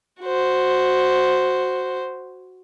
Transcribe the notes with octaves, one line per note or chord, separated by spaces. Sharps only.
F#4 C5